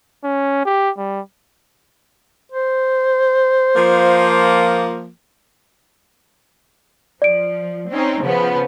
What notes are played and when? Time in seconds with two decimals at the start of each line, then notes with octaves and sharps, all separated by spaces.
0.24 C#4
0.65 G4
0.98 G3
2.52 C5
3.76 F3 A#3
7.22 F3 D5 D7
7.90 C4 C#4 D#4
8.22 C#3 F3 B3